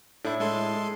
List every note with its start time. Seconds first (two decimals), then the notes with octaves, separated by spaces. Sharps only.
0.25 A2 D4 E4
0.40 G#3 A4 C6